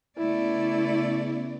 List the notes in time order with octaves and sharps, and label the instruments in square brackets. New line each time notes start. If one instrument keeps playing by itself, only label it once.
[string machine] C#3 B3 [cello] A3 D5 [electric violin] E4